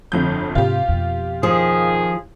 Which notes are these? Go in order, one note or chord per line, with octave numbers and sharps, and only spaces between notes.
G1 F2 G6
G#2 C3 F4 G4
F2 B2
D#3 F3 G#4